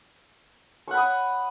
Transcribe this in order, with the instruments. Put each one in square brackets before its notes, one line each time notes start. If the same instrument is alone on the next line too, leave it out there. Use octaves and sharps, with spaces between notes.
[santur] C#6
F#5
B5
D#6